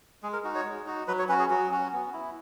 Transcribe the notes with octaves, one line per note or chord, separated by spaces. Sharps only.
G#3 G#4
A#4
D#4 F#4
C#5
G#3
D#4 F#4
F#3 B4
C#5
C#4 F#4 B4
G#4
F#3 F#4
C#4 F#4
B3
E4